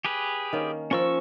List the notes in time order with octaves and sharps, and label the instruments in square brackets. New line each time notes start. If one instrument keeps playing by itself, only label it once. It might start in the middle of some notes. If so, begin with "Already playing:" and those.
[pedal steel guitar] G4 G#4 B4
[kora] D#3 A#3 C#4
[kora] F3 A#4 [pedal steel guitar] C#4 C#6 E6